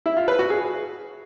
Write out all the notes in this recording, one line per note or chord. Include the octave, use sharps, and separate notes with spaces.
E4
F4
B4
F#4
G#4